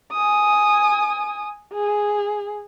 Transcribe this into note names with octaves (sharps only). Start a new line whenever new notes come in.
G#5 D#6
G#4